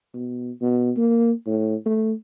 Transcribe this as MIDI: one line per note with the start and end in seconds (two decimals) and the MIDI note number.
0.14 0.51 47
0.61 0.91 47
0.97 1.32 58
1.47 1.76 45
1.86 2.12 57